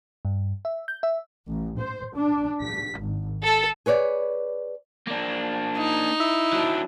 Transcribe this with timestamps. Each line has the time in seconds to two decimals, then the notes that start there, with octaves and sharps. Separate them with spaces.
0.25 G2
0.65 E5
0.88 G6
1.03 E5
1.48 A1
1.79 C5
2.15 D4
2.65 B6
3.01 G#1
3.43 A4
3.86 G#4 B4 C#5 D5
5.07 A#3 D4
5.76 D#4
6.20 E4
6.53 F#3 D4